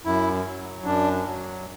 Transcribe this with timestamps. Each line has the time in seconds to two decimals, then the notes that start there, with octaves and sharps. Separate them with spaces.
0.05 F#2 E4
0.46 F#3
0.85 F#2 D4
1.26 F#3